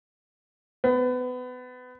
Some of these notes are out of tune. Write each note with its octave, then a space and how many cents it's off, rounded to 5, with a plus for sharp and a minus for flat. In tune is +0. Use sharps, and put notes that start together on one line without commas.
B3 +25